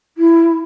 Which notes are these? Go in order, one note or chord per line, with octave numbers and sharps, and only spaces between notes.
E4